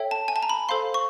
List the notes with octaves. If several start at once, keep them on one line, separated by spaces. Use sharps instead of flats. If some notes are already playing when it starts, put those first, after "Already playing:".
Already playing: A4 C#5 E5 G5
A5
G#5
A5
A#5
B5
A4 C5 F5 C6
C#6